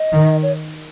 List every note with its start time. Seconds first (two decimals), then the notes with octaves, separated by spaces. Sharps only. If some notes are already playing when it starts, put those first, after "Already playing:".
Already playing: D#5
0.13 D#3
0.43 C#5